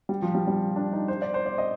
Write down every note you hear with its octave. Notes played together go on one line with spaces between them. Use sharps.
G3
F3
G3
G3
D4
D#4
C5
D5
C5
D5
D#5